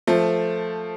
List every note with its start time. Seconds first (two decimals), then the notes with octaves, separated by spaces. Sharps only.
0.07 F3 A3